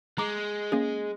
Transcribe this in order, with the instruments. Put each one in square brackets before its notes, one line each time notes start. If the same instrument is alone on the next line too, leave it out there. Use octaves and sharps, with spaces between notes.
[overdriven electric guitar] G#3 [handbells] A#5 D6
[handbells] A#3 C#4 G#4